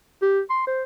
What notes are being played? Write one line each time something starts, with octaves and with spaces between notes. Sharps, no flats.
G4
C6
C5